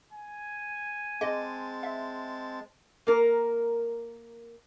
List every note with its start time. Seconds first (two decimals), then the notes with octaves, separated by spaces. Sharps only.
0.13 G#5
1.21 G#3 C4 G#4 D#5 A5
1.83 E5
3.07 A#3 A#4